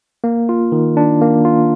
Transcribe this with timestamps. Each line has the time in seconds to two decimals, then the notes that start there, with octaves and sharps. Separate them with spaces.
0.24 A#3
0.49 F4
0.72 D#3
0.97 D4
1.21 A#3
1.45 F4